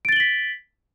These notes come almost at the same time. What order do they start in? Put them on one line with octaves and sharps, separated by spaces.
D7 A6 G7 F#7 B6